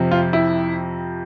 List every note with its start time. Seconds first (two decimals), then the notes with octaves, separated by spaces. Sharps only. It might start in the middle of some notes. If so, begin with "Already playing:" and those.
Already playing: F2 C3 F3
0.11 F4
0.33 E4